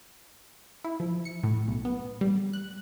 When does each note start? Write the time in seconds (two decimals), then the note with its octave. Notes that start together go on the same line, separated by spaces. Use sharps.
0.85 E4
1.00 F3
1.25 C#7
1.43 A2
1.68 B1
1.85 B3
2.21 G3
2.53 F#6